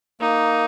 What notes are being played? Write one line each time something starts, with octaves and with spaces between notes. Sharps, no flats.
A#3 D#4